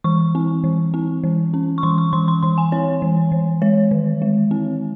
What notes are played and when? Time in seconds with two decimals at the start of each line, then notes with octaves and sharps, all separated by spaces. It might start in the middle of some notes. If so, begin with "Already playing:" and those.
0.04 E3 C#6
0.35 C4
0.64 E3
0.94 C4
1.24 E3
1.54 C#4
1.78 C#6
1.83 E3 C6
1.98 C#6
2.13 E3 C6
2.28 C6
2.43 E3 C6
2.58 G#5
2.72 C4 C#5
3.02 E3
3.32 E3
3.62 G#3 C#5
3.91 D#3
4.22 G#3
4.51 C4